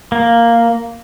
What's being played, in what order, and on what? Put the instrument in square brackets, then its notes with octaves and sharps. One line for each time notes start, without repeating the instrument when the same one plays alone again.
[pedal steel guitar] A#3